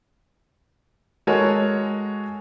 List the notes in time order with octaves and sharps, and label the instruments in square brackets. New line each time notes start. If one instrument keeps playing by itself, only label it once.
[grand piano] G#3 F#4 A4 A#4 C#5 G#5